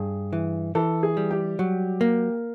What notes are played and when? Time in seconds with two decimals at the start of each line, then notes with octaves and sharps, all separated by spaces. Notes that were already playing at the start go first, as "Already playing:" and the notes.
Already playing: G2 G#4
0.33 E3
0.75 E3 A4
1.03 G#4
1.17 G3
1.31 G4
1.59 F#3
2.01 A#3